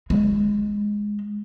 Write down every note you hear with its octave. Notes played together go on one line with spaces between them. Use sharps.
G#3